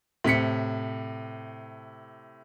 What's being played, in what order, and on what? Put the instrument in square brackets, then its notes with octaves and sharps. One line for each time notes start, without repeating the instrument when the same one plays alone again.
[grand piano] A2 C3 B6 C#7